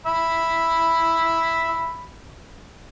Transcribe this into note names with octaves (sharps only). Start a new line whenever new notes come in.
E5 B5